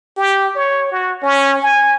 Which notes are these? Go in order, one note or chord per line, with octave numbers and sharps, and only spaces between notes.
G4
C#5
F#4
C#4
G#5